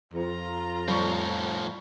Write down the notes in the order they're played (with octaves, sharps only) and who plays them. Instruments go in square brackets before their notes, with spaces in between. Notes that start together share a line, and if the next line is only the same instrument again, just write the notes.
[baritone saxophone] F2 [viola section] F4 A#5
[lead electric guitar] A2 F3 [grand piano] G3 C#6